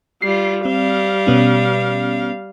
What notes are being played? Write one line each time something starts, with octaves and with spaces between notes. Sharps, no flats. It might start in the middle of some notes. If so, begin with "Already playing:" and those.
G3 F4 C7
G3 C4 F5
B2 B3 C#4